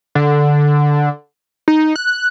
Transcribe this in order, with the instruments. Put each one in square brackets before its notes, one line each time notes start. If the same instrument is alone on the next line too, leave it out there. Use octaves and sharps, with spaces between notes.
[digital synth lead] D3
D#4
F#6